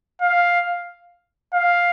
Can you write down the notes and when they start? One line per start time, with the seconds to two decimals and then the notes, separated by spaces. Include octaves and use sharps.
0.21 F5
1.54 F5